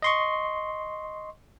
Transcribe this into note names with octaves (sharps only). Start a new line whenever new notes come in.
D#5 C6 C#6